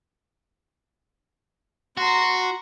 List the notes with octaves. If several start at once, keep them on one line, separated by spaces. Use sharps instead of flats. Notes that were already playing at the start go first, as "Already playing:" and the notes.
F#4 A#5 C6